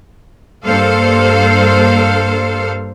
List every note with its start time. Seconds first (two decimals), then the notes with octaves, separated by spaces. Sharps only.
0.66 G2 A#3 A4 C5 F5